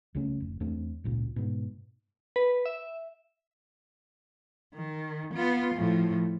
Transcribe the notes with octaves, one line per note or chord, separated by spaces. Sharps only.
C2 C#3 A3 C#4
F1
E2 A3 C4 D4
G#1 C#2 A#2
G#2 B2
B4
E5
D#3
B3 F4
A2 F3